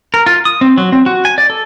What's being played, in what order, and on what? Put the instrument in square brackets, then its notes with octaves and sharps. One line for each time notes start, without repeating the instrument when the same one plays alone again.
[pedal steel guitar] A#4
F4
D#6
C4
F#3
C4
F#4
G#5
D5
A4